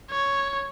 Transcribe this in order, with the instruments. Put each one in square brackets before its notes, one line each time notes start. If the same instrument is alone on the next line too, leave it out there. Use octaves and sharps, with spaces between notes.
[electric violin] C#5